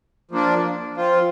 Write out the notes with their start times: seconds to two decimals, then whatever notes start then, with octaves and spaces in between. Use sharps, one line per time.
0.31 F3 A#3 D4
0.97 F3 C4 F4